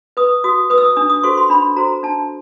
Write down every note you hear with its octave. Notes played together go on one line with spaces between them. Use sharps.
B4 D#6
F#4 D#6
B4 D#6
E6
D#6
D4 D#6
D#6
F#4 A4 C5 C#6
C6
D4 B5
F#4 A4 C5 A#5
D4 A5